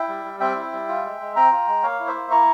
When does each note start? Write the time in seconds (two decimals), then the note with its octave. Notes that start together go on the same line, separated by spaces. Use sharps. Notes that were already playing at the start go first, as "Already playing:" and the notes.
Already playing: E4 E5 G5
0.08 G3
0.25 G3
0.40 C4 E5 G5
0.56 E4
0.73 G3
0.88 F4
1.04 G#3
1.20 G#3
1.36 C4 G5 A#5
1.52 F4
1.67 G#3
1.83 A#3 C#5 F5
2.00 E4
2.07 C5 E5
2.15 A#3
2.31 E4 A#5 C#6